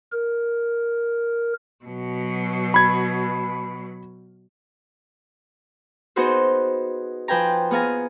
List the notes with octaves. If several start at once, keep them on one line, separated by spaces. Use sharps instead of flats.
A#4
B2 F#3
B5 G#6
B3 D#4 F#4 G#4 B4 C5
F3 B4 G5 G#5 A#5
B3 G#4 F5 G#5 A#5